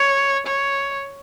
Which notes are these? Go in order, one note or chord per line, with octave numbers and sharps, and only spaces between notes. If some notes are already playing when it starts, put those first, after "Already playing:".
Already playing: C#5
C#5